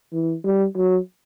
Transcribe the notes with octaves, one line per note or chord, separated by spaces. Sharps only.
E3
G3
F#3